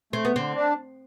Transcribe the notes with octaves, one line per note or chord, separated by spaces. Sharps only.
A3 C4
B3
D3 C4
D4